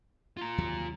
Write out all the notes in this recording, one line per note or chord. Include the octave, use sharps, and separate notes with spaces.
F4 A#5
D#2 C3 F#3